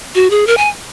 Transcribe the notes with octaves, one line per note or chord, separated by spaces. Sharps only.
F#4
G#4
A#4
G#5